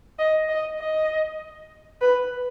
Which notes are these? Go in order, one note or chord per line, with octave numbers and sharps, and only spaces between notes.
D#5
D#5
D#5
B4